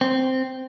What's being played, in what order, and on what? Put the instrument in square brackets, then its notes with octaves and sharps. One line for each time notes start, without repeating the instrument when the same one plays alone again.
[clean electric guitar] C4